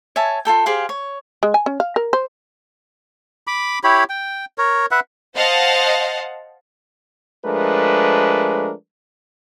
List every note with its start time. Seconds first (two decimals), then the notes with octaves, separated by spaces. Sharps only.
0.16 C#5 E5 G#5 A5
0.45 F4 G#4 A4 G5
0.66 G4 G#4 C5 F5
0.89 C#5
1.43 G#3
1.54 G#5
1.66 C#4
1.80 F5
1.96 A#4
2.13 C5
3.47 B5 D6
3.84 E4 G4 C#5 B5
4.10 G5
4.58 A#4 C#5
4.91 B4 E5 F#5
5.36 C5 D#5 F5 F#5 A5
7.45 F3 G#3 A3 D4 A#4 B4